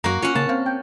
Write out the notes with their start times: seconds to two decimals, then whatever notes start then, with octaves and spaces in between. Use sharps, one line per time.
0.04 F#2 A#3 F#4 A#5
0.22 C#4 F4 F#5
0.35 C#3 A#3 A5
0.49 C4 F5
0.66 G5